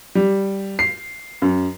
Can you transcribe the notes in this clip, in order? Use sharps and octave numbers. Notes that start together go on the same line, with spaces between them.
G3
C7
F#2